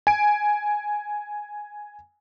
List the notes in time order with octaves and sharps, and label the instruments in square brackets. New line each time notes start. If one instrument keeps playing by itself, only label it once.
[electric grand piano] G#5 D7